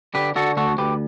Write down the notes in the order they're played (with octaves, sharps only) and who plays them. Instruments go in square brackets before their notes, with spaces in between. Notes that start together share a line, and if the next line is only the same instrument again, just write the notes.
[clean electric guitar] D3 G4 B4
D3 F#4 A4
D2 F#4 A4
D2 G4 B4